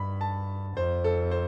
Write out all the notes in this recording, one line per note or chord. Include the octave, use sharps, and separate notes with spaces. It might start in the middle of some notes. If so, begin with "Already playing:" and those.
Already playing: G2 B5
A5
F2 C5
A4
C5